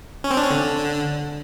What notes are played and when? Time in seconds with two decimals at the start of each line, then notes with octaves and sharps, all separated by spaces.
0.24 C#4
0.31 C4
0.37 D4
0.44 C#4
0.50 D3